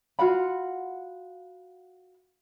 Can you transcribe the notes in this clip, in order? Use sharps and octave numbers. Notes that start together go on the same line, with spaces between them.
F4 F#4 F#5 B5